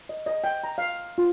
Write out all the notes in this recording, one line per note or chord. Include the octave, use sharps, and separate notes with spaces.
D#5
D#5
G5
A#5
F5
F4